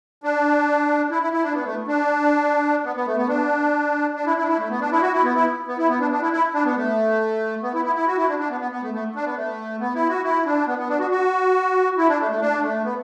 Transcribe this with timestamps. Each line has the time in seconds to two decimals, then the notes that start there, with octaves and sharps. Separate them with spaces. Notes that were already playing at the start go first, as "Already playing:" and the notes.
0.24 D4
1.11 E4
1.23 E4
1.33 E4
1.43 D4
1.54 B3
1.66 A3
1.88 D4
2.85 B3
2.96 B3
3.06 A3
3.18 B3
3.28 D4
4.16 D4
4.26 E4
4.38 E4
4.43 D4
4.48 E4
4.59 A3
4.70 B3
4.80 D4
4.92 E4
5.02 F#4
5.13 E4
5.24 B3
5.35 E4
5.68 B3
5.78 E4
5.89 B3
6.00 D4
6.11 D4
6.22 E4
6.32 E4
6.54 D4
6.65 B3
6.76 A3
7.63 B3
7.74 E4
7.85 E4
7.95 E4
8.07 F#4
8.17 E4
8.28 D4
8.39 D4
8.50 B3
8.61 B3
8.72 B3
8.83 A3
8.94 A3
9.15 D4
9.25 B3
9.37 A3
9.80 B3
9.95 E4
10.09 F#4
10.24 E4
10.45 D4
10.67 B3
10.78 B3
10.89 D4
11.00 F#4
11.11 F#4
11.97 E4
12.08 D4
12.20 A3
12.31 A3
12.41 D4
12.63 A3
12.84 B3